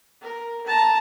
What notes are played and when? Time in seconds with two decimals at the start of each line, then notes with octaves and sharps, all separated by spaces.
0.22 A#4
0.66 A5 A#5